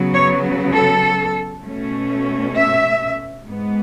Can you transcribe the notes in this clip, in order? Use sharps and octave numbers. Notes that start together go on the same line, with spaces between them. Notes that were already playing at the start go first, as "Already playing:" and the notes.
Already playing: C#3 F#3 B3
C#5
A4
B2 A3 C#4
E5
G#2 G#3 B3